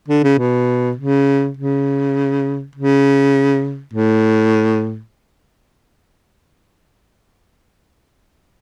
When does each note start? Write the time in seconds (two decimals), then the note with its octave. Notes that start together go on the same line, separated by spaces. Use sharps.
0.09 D3
0.24 C#3
0.38 B2
0.97 C#3
1.57 C#3
2.76 C#3
3.94 A2